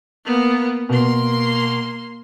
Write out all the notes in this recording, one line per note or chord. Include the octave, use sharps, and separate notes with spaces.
A#3 B3
B2 A#3 C6